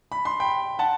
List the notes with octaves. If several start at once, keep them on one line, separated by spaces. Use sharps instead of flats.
B5
C6
G5 B5
F#5 A5